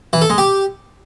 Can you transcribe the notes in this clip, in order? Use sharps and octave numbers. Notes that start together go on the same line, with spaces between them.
E3
A4
G#3
G4